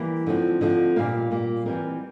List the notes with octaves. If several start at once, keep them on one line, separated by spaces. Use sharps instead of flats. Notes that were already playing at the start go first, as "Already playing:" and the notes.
Already playing: E3 G3 A#3
D3 F3 C4
D3 F3 C4
A#2 G3 A#3 F5
A#2 G3 A#3
E3 G3 C4 A#4